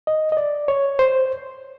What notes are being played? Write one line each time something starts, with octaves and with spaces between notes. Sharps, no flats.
D#5
D#5
D5
C#5
C5